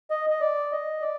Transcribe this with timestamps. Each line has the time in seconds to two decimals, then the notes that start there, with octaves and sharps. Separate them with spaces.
0.11 D#5
0.30 D#5
0.41 D5
0.72 D#5
1.01 D5